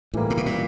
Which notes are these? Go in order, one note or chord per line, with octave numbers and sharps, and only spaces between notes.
A2 E3 G3 A#3
A2
B2
A#2